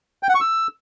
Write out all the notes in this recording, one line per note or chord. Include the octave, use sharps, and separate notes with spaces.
G5
F#5
C#6
E6